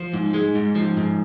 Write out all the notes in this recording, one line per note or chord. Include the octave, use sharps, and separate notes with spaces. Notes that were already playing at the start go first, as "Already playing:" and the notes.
Already playing: F3 C5
G#2
G#3
G#2
F3
G#2